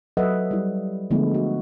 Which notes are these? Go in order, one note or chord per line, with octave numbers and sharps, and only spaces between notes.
F#3 A4 B4 D#5 E5 F#5
G3 E4
D3 F3 G#3 A3 B3 E4
F#4